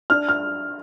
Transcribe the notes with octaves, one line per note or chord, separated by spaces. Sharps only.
D4 F6
F6